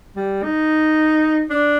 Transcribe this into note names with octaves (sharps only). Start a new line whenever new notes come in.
G3
D#4
D4